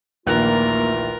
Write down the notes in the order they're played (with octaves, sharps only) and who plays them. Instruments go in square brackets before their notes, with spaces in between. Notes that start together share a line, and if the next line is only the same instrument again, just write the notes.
[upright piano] A#1 D#2 F#6 [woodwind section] E3 A3 F4 [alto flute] A#3 [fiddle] A#4